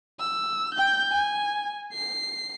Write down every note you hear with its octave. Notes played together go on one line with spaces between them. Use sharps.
E6
G5 G6
G#5
C7